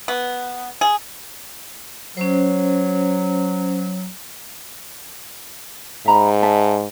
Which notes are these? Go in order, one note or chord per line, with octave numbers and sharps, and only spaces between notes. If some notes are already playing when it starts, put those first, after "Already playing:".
B3
G#4
F#3 C#4 C5
G#2 E5 A#5 B5
D#5 E5 A5